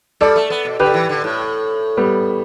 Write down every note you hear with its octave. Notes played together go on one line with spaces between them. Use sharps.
G3 A4 D5
A3
B3
B2
D3 G4 B4
E3
D3
A2
G3 B3